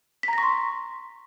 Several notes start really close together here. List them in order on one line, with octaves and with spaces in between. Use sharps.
B6 A#5 A#6 C#6 C6